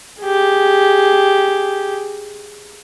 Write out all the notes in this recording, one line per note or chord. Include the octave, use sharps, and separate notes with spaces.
G4 G#4